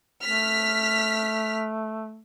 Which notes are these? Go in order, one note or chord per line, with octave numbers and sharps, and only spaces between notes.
A3 F6 B6